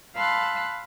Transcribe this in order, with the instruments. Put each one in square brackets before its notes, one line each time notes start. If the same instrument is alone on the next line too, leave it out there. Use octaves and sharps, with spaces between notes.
[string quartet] F5 A5 B5 C6 E6 F#6